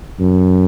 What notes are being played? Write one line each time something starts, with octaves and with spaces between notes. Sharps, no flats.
F#2